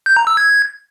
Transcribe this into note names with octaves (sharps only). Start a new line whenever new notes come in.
G6
A#5
E6
G#6